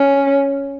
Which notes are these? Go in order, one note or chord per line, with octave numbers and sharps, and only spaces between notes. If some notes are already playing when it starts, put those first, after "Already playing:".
Already playing: C#4